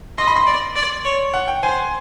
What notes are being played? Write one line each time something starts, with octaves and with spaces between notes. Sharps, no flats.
D#5 C6
B5
C6
D5
D5
C#5
F#5
G5
C5 G#5